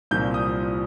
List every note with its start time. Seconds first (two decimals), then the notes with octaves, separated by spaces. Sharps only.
0.11 C2 A#2 F3 C4 G6
0.34 D#6